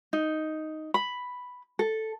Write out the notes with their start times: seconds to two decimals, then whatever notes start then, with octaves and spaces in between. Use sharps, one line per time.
0.13 D#4
0.94 B5
1.79 A4